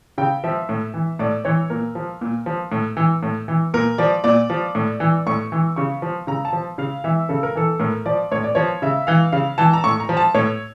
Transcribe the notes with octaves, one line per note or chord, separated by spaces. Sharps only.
C#3 G5
F3 E5
A2
E3
A2 D5
E3 C#5
A#2 A#4
F3
A#2
F3
A2
E3
A2
E3
A#2 A#4
F3 D5
A#2 D5
F3
A2
E3
A2 C#6
E3
C#3 C#6
F3
C#3 A#5
A5
F3
C#3 F5
E3 E5
C#3 A4
A#4
E3 A4
A2 A#4
F3 D5
A2 C#5
D5
F3 C#5
C#3 E5
E3 F5
C#3 F5
E3 A5
A#5
A2 C#6
A#5
F3
A5
A2 C#5